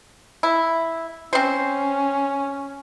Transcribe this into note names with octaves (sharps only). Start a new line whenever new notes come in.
E4
C4 C#4 C5